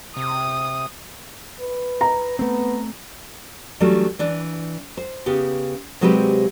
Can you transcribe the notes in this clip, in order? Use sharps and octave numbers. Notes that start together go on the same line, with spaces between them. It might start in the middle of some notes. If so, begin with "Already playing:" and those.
C3 D#6
B4
A#5
A3 B3 C4
E3 F#3 G3 A3 C#4 D4
E3 D4
C5
C#3 B3 G4
C3 F#3 G#3 C4 G4 B4